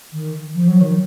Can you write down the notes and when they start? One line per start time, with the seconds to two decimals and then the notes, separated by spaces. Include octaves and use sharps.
0.12 D#3
0.53 F3
0.67 F#3
0.81 D#3